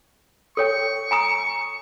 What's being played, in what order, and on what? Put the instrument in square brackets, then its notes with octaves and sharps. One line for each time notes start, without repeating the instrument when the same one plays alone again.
[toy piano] A4 C#5 G5 [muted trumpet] C#6
[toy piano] G#5 A#5 D#6